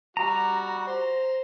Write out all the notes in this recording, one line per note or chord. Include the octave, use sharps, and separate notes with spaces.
G3 F#4 A#5
C5